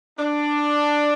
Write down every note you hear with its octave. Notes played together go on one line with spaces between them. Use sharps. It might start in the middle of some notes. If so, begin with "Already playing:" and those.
D4